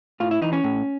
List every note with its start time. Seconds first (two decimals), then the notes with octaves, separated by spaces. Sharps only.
0.20 A2 F4
0.31 E4
0.42 E3 D#4
0.53 C#4
0.64 A2